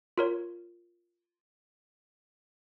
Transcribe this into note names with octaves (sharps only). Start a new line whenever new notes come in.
F4 A#4 C#5